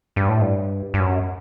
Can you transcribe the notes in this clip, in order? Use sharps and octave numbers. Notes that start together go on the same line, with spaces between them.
G2
A2
G2
G2
F#2